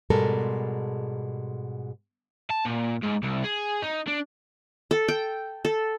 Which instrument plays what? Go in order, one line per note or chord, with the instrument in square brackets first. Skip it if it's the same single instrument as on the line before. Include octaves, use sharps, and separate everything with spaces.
[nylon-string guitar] G#2 B2 G3 G#3 A4 A#4
[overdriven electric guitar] A5
A#2
G#2
C2
G#4
D#4
D4
[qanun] A4
G5
A4